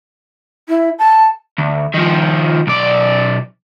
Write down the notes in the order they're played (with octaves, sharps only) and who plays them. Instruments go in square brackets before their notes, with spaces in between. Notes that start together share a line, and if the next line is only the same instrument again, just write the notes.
[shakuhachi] E4
A5
[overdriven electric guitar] D2
D#3 F3
B1 D5